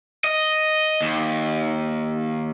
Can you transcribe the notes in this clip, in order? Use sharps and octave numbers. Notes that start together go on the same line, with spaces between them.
D#5
D#2